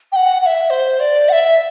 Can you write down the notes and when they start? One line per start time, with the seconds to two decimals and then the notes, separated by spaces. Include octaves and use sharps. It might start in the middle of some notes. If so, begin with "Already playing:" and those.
0.12 G5
0.16 F#5
0.42 F#5
0.46 E5
0.70 C5
1.00 D5
1.29 F#5
1.32 E5